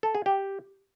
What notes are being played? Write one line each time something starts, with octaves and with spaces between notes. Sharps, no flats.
A4
G#4
G4